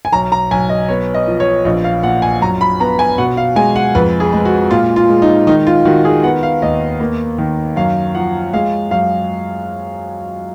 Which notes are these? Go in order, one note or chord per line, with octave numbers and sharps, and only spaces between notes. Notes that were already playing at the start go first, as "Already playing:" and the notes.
G#5
B1 A#5
A#5
B1 G#5
D#5
B3 C#5
D#5
F3
C#5
A#1 D#5
F5
A#2 F#5
G#5
F#2 A#5
B5
B3 A#5
G#5
B2 F#5
F5
G#3 G#5
F#5
F2 B4
G#4
G#3
F#4
A#2 F4
F4
G#3
D#4
D#3 D#4
F4
D#3 F#4
G#4
B3 F#5
F5
D#2 D#5
A#3
D#3
F#2 F5
F3 F#5
G#3 F5
F#2 F5